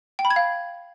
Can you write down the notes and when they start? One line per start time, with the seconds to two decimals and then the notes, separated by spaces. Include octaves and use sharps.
0.19 G5
0.25 B5
0.30 G#6
0.36 F5